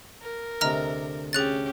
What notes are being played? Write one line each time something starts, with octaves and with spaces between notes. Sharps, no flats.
A#4
D2 C3 D#5 A#5 F6
C#4 G4 G#4 F#6 A6